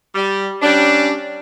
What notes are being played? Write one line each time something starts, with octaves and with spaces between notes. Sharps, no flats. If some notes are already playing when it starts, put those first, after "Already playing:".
G3
G3 C#4 D4